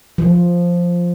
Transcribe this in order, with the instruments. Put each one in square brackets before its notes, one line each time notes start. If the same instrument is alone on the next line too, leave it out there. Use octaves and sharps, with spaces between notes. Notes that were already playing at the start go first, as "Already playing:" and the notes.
[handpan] F3